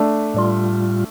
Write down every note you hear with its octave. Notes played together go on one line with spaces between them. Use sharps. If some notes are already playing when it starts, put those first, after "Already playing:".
Already playing: A3 D4
A2 G3 F4